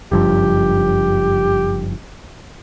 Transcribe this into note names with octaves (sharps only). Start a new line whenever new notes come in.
F#1 G2 F3 G4